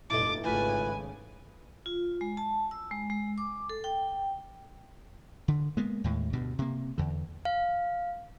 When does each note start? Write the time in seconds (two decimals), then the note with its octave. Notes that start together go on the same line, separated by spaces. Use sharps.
0.10 F1 G2 A#2 E4 A4 D#5 D6 A6
0.45 G#1 C#3 A3 F4 G4 B4 G#5
1.86 F4
2.21 G#3
2.37 A5
2.71 E6
2.91 G#3
3.10 G#3
3.38 D6
3.69 A4
3.84 G5
5.48 D3
5.77 G#3 A#3 B3
6.04 D#2 A2 G#3
6.33 D2 G2 B2
6.59 C3 A#3
6.98 E2 D3
7.45 F5